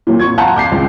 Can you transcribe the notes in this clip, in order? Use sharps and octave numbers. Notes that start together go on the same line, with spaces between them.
A#2 F#3
C#6 G#6
F5 F#5 A5 A#5 C6 G6
D6 G6 C7
C#2